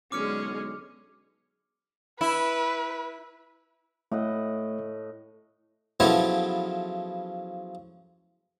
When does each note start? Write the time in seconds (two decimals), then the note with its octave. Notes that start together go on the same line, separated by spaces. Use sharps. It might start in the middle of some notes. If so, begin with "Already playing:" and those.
0.12 B1 D3 G#3 C#4 G#4 D6 F6 C#7
2.21 E4 B4
4.12 A2 A3 D#5 F#5
6.00 C#3 F3 F#3 B3 E4 A4